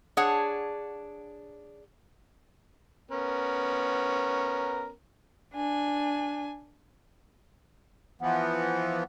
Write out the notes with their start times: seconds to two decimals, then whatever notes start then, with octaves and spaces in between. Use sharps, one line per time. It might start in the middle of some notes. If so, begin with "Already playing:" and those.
0.17 D4 G#4 C#5 F#5
3.11 B3 C#4 A#4
5.54 D4 G#5
8.21 E3 F3 B3 F#5